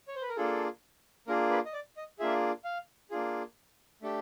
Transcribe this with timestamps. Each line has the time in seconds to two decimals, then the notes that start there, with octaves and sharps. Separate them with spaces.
0.08 C#5
0.15 C5
0.22 B4
0.29 A#4
0.36 A#3 D4 F4 G#4 A4
1.27 A#3 D4 F4 G#4 A#4
1.51 B4
1.66 D#5
1.73 D5
1.97 D#5
2.19 A#3 D4 F4 G#4 E5
2.64 F5
3.11 A#3 D4 F4 G#4
4.02 A3 D4 G4